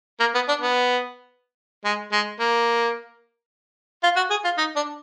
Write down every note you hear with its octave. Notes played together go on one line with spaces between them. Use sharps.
A#3
B3
D4
B3
G#3
G#3
A#3
F4
F#4
G#4
F4
D#4
D4